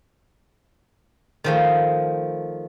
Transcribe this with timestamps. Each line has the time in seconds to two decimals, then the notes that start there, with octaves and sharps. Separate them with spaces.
1.44 D#3 F3 A3